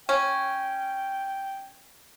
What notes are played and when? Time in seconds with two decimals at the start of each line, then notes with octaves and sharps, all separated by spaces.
0.09 C#4 G5